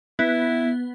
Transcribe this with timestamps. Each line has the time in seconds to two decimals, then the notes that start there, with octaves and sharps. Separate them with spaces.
0.19 B3 E4